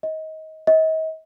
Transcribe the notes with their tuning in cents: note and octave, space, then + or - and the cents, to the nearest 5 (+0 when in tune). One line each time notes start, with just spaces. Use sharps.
D#5 +25
D#5 +40